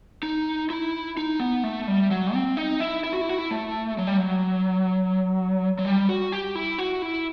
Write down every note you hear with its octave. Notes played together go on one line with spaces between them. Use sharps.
D#4
E4
D#4
B3
A3
G3
F#3
C4
D#4
E4
E4
F#4
E4
F#4
E4
A3
F#3
G3
F#3
F#3
G3
F#4
G4
E4
F#4
E4